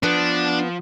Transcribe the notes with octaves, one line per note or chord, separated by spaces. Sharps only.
F3 B3 D4